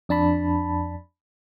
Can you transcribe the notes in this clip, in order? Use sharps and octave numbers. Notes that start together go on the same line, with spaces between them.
F2 D4 A5 B5